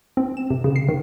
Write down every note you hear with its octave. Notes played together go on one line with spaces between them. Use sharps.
C4
E7
C3
C#3
C7
D#3